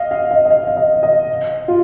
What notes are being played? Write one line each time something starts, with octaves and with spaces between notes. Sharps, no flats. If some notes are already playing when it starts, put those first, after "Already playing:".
Already playing: D#5 F5
F5
D#5
D#5
F5
F5
D#5
F5
D#5
F4